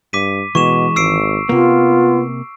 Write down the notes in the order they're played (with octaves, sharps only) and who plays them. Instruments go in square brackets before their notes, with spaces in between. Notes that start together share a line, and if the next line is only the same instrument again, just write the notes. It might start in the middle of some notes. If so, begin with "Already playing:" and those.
[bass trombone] G2 [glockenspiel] D6 B6 D#7
[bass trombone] B2 [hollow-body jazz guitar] E3 G#3 [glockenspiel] C#6 E7
[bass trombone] G#1 [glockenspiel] E6 C7 D7
[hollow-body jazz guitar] C3 A#3 [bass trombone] B3 [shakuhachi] F4